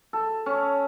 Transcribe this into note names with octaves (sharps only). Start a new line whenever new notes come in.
A4
C#4